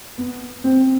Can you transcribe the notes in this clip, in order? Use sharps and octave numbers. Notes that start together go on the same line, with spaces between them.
B3
C4